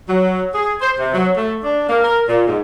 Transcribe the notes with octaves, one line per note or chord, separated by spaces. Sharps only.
F#3
G#4
C5
C3
F#3
A3
D4
A#3
A#4
A#2
G#2